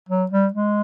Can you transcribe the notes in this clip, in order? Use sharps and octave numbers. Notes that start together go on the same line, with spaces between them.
F#3
G3
G#3